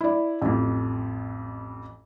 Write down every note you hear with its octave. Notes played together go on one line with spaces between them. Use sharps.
E4 D5
A1 F2